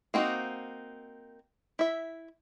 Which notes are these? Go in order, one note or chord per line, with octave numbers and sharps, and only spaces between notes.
A#3 C4 D#4 F#4
E4 E5